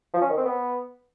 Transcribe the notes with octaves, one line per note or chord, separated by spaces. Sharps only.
F3
C#4
D#3
C4
B3